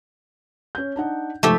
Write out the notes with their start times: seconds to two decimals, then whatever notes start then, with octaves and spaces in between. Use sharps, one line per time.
0.75 C#4 G6
0.96 D4 D#4 F#5
1.43 F1 G#2 F3 A3 G4 E5